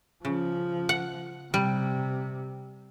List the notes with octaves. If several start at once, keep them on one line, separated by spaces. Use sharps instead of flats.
C#3 F3
F#5
C3 G3